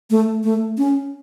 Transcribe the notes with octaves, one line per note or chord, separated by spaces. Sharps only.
A3
A3
C#4